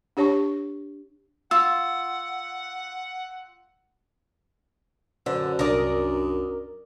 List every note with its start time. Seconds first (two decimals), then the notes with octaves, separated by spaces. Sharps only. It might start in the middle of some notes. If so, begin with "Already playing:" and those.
0.17 D4 G4 C#5 A5 C#6
1.51 F4 F#5 E6
5.26 F#2 D3 B4 C5 D5
5.59 C2 D4 A#4 D5 D#6